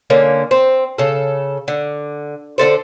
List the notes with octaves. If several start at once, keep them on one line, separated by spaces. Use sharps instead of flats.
D3 A#3 C#4
C4
C#3 A4
D3
D3 D#4 A4 C5